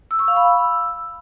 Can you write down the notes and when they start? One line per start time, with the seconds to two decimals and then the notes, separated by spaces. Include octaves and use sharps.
0.11 E6
0.19 C#6
0.28 F5
0.36 B5
0.45 E6